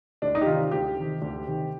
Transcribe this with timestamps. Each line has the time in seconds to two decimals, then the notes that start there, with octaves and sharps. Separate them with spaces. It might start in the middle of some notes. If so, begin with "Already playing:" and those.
0.22 D2 D4
0.35 D#4
0.41 G4
0.46 C3 D#3 F4
0.72 D2 G4
0.96 C3 D#3
1.22 D2
1.47 C3 D#3